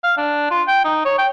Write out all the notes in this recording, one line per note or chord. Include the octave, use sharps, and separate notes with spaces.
F5
D4
F4
G5
D#4
C#5
G5